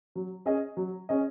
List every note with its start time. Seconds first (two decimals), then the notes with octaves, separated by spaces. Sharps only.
0.15 F#3
0.46 C#4 G#4 D#5
0.77 F#3
1.09 C#4 G#4 D#5